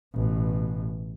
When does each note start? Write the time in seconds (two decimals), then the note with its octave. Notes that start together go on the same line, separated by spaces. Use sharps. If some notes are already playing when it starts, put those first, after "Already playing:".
0.14 A1 B2